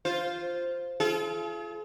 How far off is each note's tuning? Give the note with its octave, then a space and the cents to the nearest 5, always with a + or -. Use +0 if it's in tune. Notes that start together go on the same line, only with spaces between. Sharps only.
F4 +0 C5 +0
F4 -35 G#4 +45